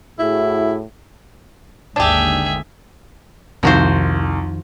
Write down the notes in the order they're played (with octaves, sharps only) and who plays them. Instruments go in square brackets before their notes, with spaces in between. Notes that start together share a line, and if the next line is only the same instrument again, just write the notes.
[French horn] A2 [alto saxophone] E4 [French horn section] F#4 G#4
[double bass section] G#1 D#2 D3 [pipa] D4 G4 [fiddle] G#4 E5
[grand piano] C2 [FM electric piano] F2 D#3 [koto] F3 F#4 C5